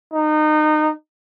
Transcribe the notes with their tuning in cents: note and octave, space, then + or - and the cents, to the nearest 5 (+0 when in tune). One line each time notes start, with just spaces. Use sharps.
D#4 -25